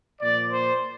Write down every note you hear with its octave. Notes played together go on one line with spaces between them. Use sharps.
A#2 F3 D5
C5